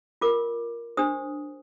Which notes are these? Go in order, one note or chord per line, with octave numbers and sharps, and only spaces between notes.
F4 A#4 D6
D4 G4 C5 D#6